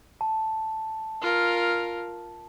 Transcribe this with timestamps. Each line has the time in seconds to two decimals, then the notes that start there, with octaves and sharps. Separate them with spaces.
0.21 A5
1.21 F4 A#4